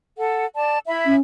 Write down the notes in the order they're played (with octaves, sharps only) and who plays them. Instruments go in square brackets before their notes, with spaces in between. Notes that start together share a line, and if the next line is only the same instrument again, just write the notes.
[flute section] A4 F#5
D5 A5
E4 E5 B5
[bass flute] C#4